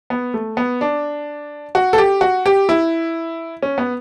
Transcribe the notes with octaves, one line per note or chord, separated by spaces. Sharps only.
B3
A3
B3
D4
F#4
A4
G4
F#4
G4
E4
C#4
B3